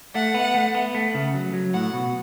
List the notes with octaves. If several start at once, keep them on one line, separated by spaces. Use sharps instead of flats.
A3 F#5
B3
A3
B3
A3
C#3
F#3
F#3
A2 F#5
B2